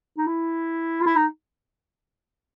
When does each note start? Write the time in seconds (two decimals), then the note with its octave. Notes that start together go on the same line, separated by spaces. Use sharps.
0.18 D#4
0.27 E4
1.01 F4
1.06 E4
1.16 D#4